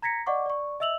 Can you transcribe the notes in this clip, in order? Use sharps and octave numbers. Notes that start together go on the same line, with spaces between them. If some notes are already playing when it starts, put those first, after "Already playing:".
A#5 G#6 A#6 B6 C#7
D5 D#5 F#5 C#6 D6
D5 C#6
D#5 E5 E6 F7 F#7